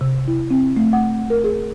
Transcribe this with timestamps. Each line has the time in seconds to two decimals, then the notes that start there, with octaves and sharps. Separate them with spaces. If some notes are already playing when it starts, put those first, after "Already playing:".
0.01 C3
0.28 E4
0.50 C4
0.77 A3
0.93 F#5
1.30 A#4
1.44 G#4